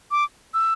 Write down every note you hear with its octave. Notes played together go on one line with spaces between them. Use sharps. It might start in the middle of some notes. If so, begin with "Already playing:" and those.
D6
E6